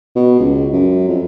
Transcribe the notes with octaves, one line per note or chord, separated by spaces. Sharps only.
B2
C#2
F#2
F2